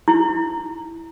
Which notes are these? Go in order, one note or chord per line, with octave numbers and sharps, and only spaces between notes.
E4